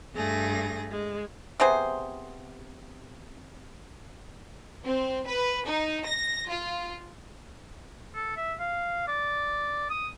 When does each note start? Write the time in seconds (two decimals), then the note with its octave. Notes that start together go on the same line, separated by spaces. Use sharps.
0.15 G2 A3 G#4 A#6
0.91 G#3
1.60 C3 B3 G#4 C5
4.85 C4
5.27 B4
5.66 D#4
6.06 A#6
6.50 F4
8.14 A4
8.37 E5
8.59 F5
9.08 D5
9.90 D#6